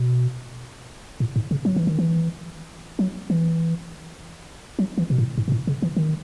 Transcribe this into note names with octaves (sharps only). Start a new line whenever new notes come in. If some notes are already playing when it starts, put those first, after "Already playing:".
Already playing: B2
A2
G#2
C#3
F#3
E3
D#3
E3
F#3
E3
F#3
E3
B2
A2
G#2
B2
A2
C#3
E3
D#3